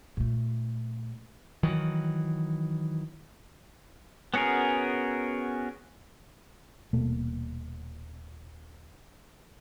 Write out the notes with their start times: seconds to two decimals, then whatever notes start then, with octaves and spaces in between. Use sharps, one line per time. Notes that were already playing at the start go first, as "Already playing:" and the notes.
0.17 A#2 A3
1.63 D#3 E3 F#3
4.34 B3 C#4 F#4 G#4 A#4
6.93 D#1 B2 A3 A#3